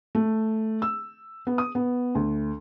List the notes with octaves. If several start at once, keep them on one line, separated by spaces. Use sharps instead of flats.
A3
E6
B3
D#6
B3
D2